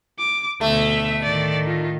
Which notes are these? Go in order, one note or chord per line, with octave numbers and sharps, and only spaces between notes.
D6
D2 B2 A3 E5
A2 D#3 D5
F4